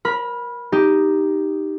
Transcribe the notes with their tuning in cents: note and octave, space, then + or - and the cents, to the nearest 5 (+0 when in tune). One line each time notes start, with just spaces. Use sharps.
A#4 +20 B5 -15
D#4 +0 G4 +0